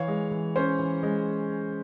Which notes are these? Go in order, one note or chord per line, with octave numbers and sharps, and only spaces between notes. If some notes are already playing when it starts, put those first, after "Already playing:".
Already playing: E3 C#5 F5
G#3
E3
C#4 C5
E3
G#3